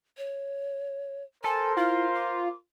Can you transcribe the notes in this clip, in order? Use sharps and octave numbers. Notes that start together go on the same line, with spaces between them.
C#5
A4 A#4 C5 G#5 C6
E4 F4
D6